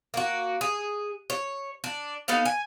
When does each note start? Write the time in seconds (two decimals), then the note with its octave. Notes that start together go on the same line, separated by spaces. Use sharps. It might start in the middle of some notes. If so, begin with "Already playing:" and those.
0.14 A#3 F#4
0.61 G#4
1.30 C#5
1.84 D4
2.28 B3 D#4 A4 F5
2.46 G#5